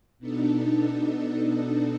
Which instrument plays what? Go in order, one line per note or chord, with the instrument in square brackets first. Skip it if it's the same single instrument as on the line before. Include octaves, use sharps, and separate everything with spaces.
[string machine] B2 B3 D4 D#4 A4